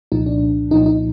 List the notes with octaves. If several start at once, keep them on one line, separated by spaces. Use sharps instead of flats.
C2 A#2 F3 D#4
D4
C2 A#2 F3 D#4
D#4